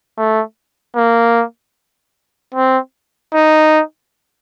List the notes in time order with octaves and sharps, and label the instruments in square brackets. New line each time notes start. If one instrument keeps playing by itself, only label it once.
[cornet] A3
A#3
C4
D#4